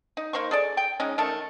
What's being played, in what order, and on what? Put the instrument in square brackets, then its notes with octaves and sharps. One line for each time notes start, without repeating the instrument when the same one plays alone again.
[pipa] D#4
A#3 D#4 C5 C#6
G#4 A4 D5
G5
G#3 C#4 D#4
D#3 A3 A4